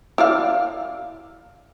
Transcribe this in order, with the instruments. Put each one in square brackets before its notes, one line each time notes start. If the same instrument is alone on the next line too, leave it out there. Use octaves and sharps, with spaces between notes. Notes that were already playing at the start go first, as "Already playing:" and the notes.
[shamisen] E4 D5 F5